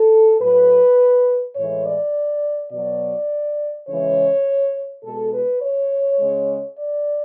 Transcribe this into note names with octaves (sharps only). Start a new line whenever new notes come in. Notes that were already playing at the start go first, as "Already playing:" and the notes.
Already playing: A4
A2 F#3 B4
A2 E3 G#3 C#5
D5
B2 F#3 D5
C#3 E3 G#3 C#5
B2 G#3 A4
B4
C#5
C#3 G#3
D5